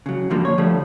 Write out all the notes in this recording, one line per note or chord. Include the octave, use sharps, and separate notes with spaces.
C#3 F#3
F#2 D3 F3 G3 A#3
C#5
D3 F3 G3 A3